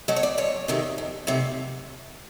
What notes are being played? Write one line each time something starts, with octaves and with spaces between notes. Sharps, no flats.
F#3 A3 D#5
C#5
D5
F2 C#5
C3 D#3 F#3 A3
F2
C3 D#3 F#3 A3